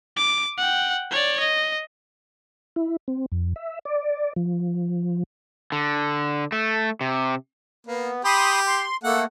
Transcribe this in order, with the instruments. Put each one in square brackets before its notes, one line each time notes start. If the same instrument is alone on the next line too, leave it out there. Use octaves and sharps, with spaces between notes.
[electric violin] D6
F#5 G5
C#5 D5
D#5
[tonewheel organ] E4
C4
F2
E5
D5
F3
[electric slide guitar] D3
A3
C3
[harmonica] A#3 [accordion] B3
[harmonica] G4 [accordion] B5 C6 D#6
[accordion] C6
[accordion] A3 A#3 [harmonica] A4 F#5